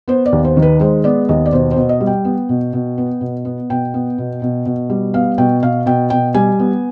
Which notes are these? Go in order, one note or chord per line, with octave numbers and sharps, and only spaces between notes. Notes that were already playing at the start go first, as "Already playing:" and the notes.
B3 C5
D5
D#2
C5
D#3
B4
G#3 C5
B3 D5
D#2 D#5
D5
B2 C5
C5
B2
D#5
G3
G5
B3
B2
B2
B3
B2
B3
B2 G5
B3
B2
B2
B2
G3
B3 F5
B2 G5
B2 F5
B2 G5
B2 G5
G3 G#5
B3